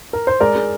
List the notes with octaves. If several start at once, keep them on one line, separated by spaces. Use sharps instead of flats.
A#4
C5
G#3 A#4 D5
G#3